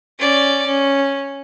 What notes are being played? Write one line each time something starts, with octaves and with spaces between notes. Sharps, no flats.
C#4 D5
C#4